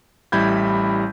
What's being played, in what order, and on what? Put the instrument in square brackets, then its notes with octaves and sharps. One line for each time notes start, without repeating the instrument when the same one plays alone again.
[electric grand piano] A1 G3 E4 B5 G6 G#6